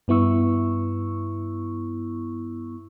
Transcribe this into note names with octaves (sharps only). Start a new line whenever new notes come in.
G2 B3 E4 C#6 E6